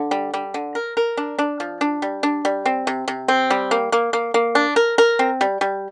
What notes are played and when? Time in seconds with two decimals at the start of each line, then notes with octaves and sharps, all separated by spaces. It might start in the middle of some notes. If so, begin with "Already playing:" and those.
Already playing: D3
0.11 G3
0.34 G3
0.54 D3
0.75 A#4
0.97 A#4
1.17 D4
1.39 D4
1.60 F3
1.81 D4
2.02 G3
2.23 D4
2.45 G3
2.66 C4
2.87 C3
3.08 C3
3.28 C4
3.50 G3
3.71 A#3
3.92 A#3
4.13 A#3
4.34 A#3
4.55 D4
4.76 A#4
4.98 A#4
5.19 C4
5.41 G3
5.61 G3